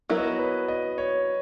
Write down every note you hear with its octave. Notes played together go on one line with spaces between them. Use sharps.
F#3 B3 E4 A#4
D#5
C#5
B4
D#5
C#5